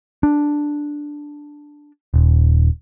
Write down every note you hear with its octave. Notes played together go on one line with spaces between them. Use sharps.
D4
D#1